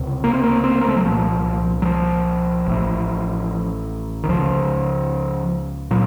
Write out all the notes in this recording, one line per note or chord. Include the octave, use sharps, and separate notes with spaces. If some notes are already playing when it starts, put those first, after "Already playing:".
Already playing: C#2 C3
A#3
C4
A#3
C4
A#3
A3
F#3
C2 A#2 F3
F#3
F3
A1 A2
D#3
C#2 C#3 F3
A#2 F#3